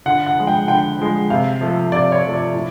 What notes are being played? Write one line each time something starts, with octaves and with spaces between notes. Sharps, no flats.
D3 F#5
F#5
F3 G#3
G5
D3 G5
F3 G#3
C3 F5
F3 A3
C3 D5
C#5
F3 A3
D5
A2